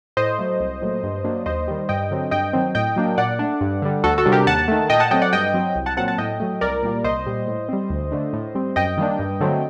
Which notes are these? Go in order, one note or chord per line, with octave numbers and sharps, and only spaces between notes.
A2 C5 D#5
F#3 A3
C2
A#2 F#3 A3
G2
F#3 A#3 D4
D#2 C5 D#5
D#3 G3
G2 D#5 G5
D3 F#3 C4
G2 D#5 G5
D#3 F#3 C4
A2 D#5 G5
F#3 A#3 D4
A#2 D5 F#5
A3 D4
G2
D3 G3
D2 F#4 A4
F#4 A4
C3 G3 D4
G4 A#4
D#2 F#5 A5
D#3 A3
A#2 D#5 G5
F#5 A5
F#3 A3 C4 D#5 G5
D5 F#5
G2 D#5 G5
F#3 C4
C2
F#5 A5
A#2 F#3 C4 F#5 A5
F#5 A5
A2 D#5 G5
F#3 A3
C2 A#4 D5
A#2 G3 A#3
C2 C5 D#5
A#2 G3
A2
G3 C4
D2
D3 A3 D4
A2
G3 C4
F#2 D#5 G5
D#3 G3 A#3 D4
G2
D3 F#3 A3 C4